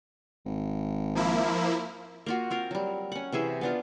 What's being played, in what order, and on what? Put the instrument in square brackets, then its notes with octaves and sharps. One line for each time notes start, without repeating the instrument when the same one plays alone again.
[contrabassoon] G#1
[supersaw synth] F3 A#3 E4
[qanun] A#3 F4 F#4
C4 F4 A#4
F#3 G3
C#4 F#5
C3 E3 G#4 E5
B3 D4 F4